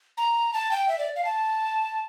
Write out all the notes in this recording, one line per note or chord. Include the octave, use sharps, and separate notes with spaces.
A#5
A5
G5
E5
D5
F5
A5